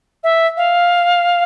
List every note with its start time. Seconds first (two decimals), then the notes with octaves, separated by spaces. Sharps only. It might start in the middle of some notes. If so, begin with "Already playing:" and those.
0.24 E5
0.57 F5